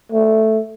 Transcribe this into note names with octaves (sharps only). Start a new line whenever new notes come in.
A3